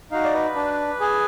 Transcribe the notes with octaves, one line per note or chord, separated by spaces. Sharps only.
D#4 F#4 F5
D5
B4
D4
G#4